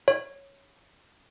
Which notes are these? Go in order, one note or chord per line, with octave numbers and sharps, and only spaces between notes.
C#5